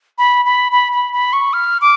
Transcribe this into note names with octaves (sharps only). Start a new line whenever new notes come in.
B5
B5
B5
B5
B5
C#6
F6
D6